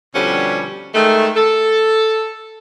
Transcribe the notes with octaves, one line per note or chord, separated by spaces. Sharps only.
B2 D3 F3 G3 C#4
D#3 G#3 A3
A4